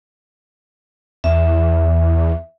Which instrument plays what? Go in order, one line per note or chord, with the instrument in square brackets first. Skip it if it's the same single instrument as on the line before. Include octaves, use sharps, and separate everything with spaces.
[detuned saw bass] E2 [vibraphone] E5